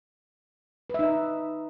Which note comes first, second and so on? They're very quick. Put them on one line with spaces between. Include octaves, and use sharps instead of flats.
B4 E5 D#4